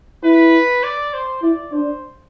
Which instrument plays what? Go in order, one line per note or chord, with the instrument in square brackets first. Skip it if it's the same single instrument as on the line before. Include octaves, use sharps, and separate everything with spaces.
[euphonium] E4 [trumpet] B4
[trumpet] D5
C5
[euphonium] E4 [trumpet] D5
[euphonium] D4 [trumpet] C5